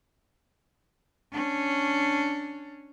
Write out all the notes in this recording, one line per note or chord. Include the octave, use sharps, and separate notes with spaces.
C#4 D4